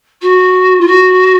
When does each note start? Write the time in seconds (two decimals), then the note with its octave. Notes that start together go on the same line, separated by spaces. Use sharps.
0.21 F#4
0.80 F4
0.87 F#4